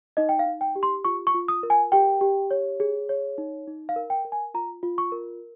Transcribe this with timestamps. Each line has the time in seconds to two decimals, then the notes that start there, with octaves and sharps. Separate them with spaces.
0.17 D#4 D#5
0.29 G5
0.39 F5
0.46 D#4
0.61 G5
0.76 G4
0.83 C6
1.05 F4 C#6
1.27 C#6
1.34 F4
1.48 D#6
1.63 A#4
1.70 G#5
1.92 G4 G5
2.21 G4
2.51 C#5
2.80 G#4
3.09 C#5
3.38 D#4
3.68 D#4
3.89 F5
3.96 A#4
4.10 G5
4.25 A#4
4.32 G#5
4.54 F4 A#5
4.83 F4
4.98 C#6
5.12 A#4